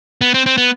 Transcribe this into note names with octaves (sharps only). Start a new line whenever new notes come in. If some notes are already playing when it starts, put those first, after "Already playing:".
B3
C4
C4
B3